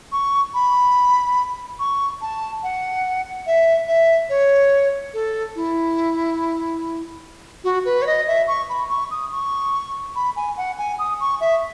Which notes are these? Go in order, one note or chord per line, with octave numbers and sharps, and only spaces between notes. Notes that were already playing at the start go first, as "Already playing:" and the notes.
C#6
B5
C#6
A5
F#5
E5
E5
C#5
A4
E4
F#4
B4
C#5
D#5
E5
C#6
B5
C#6
D#6
C#6
B5
G#5
F#5
G#5
D#6
C#6
E5